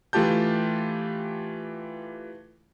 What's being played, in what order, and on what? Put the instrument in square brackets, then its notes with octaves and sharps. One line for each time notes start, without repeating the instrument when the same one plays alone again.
[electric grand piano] E3 A3 F4 G4 A5 G6